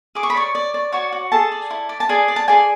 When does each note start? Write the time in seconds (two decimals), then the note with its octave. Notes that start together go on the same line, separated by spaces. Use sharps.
0.15 G#4 D6
0.23 C#6
0.30 B5
0.35 C#5 D5 C#6
0.55 D5
0.74 D5
0.92 F#4 C#5 C#6
1.12 F#4
1.32 G#4 A4 A5
1.52 D5
1.71 E4
1.89 D5
2.00 A5
2.09 G#4 D5 G#5
2.28 D5
2.36 A5
2.48 G#4 D5 G#5